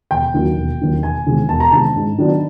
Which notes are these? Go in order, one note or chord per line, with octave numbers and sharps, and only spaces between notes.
E1 G5
D#2 D#3 F#3
E1
D#2 D#3 F#3
E1 G#5
E2 C3 D#3 G#3
E1 A5
A#5
E2 C3 D#3 G#3 A5
G#2
D#3 F#3 B3 D4